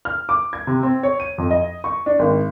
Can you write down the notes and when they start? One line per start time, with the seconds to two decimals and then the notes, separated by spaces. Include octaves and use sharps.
0.05 F6
0.29 D6
0.53 G#6
0.67 C3
0.83 C4
1.03 C#5
1.20 D#7
1.38 F2
1.51 D#5
1.84 C#6
2.06 D4
2.19 G#1